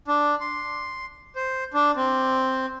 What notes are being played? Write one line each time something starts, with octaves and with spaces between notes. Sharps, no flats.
D4
C6
C5
D4
C4